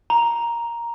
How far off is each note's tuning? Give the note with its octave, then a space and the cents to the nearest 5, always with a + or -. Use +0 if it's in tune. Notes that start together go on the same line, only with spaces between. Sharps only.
A#5 +5